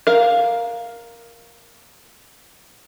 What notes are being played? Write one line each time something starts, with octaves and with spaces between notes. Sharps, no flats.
A#4 F5